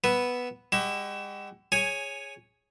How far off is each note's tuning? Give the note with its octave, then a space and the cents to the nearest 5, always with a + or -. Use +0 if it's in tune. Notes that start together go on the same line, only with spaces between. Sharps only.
B3 +0 B4 +0 E5 +0
G#3 -45 F#4 +45 E5 +10
G#4 -5 C#5 +0 G#5 +10